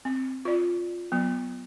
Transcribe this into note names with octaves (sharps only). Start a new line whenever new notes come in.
C4
F4 D5
F#3 B3